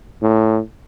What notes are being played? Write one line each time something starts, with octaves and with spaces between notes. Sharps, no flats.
A2